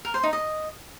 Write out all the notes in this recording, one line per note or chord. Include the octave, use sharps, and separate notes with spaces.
A#4
C5
D#4
D#5